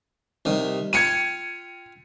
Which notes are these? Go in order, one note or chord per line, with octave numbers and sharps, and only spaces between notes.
C2 D#3
F4 G5 G#6 C#7 D#7